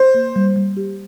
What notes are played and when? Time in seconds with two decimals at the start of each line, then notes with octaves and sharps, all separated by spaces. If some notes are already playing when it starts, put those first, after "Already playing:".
Already playing: C5
0.14 A#3
0.36 G3
0.56 G3
0.77 G4